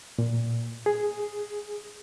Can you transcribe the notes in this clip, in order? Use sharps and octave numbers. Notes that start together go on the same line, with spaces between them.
A#2
G#4